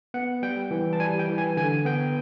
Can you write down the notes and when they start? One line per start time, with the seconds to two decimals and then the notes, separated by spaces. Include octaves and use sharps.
0.14 B3 F#5
0.43 G3 G5
0.71 E3
0.93 A5
1.00 G3 G#5
1.19 G5
1.29 E3
1.38 G#5
1.57 D3 G#5
1.85 B3 G5